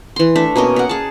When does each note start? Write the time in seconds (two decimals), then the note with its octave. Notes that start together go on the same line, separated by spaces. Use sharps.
0.16 E3 C6
0.35 A3 D4 E5
0.56 B2 A#3 C#4 D#5
0.76 A#4 F#5
0.89 G#4 A5